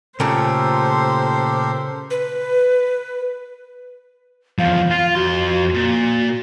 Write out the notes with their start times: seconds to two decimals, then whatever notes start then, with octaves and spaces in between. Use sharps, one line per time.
0.20 A#2 C#3 A3 G4 A4 A#4 C5
2.11 B4
4.59 E2 F3 F5
4.91 F4
5.15 F2 F#4 C6
5.74 A#2